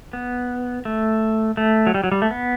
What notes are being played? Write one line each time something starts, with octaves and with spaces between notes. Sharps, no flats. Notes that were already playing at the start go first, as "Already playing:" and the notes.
B3
A3
A3
F#3
G3
F#3
G3
A3
B3